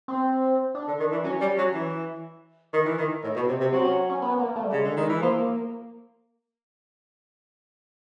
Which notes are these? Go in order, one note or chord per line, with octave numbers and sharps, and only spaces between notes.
C4
D4
D3
D#3
E3
F#3 C#4
G3
F#3
E3
D#3
E3
D#3
A2
B2
C3
C3
F#3 C4
C#4
C#4
B3
A#3
A3
G3
C#3 G#3
D3
D#3
E3
F3 A#3